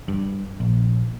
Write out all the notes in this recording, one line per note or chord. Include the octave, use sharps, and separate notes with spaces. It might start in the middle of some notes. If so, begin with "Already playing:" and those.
G2
A#1